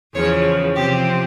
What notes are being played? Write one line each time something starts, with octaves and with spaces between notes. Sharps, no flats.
E2 C#3 F3 C#5
C3 F3 C4 G4